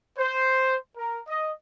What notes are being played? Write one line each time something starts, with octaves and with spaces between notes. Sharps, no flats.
C5
A#4
D#5